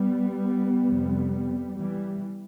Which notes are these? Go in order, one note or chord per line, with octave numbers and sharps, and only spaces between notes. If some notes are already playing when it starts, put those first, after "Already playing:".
Already playing: G3 B3
F2 C3
E3 G3